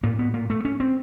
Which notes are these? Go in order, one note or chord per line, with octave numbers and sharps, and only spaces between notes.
A2 A#3
B3
A#3
A3
C#4
C4